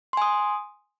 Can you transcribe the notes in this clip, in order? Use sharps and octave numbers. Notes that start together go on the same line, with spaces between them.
G#5 C6 D#6